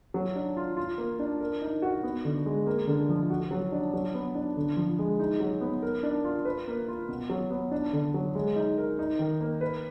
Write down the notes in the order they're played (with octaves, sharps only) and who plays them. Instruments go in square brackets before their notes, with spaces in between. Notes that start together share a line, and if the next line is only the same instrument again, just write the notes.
[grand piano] F#3
D4
F4
F4
A#3
D4
A#4
D#4
F#4
B3
D3
G#3
A#3
D3
F3
F#4
F#3
D4
F#3
B3
D4
D3
F3
G#3
D#4
F#3
B3
A#4
D4
F4
B4
A#3
F4
B2
F#3
B3
D4
D3
F#3
G#3
D#4
A#4
D#4
D#3
A#3
B4